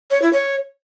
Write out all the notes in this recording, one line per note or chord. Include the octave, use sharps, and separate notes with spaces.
C#5
E4
C#5